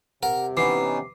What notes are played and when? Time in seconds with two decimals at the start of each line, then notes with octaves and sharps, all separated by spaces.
0.23 C3 G4 A#4 F#5
0.57 E3 B3 C#4 D#4 D6 C7